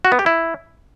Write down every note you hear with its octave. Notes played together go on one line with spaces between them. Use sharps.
F#4
B3
G4
E4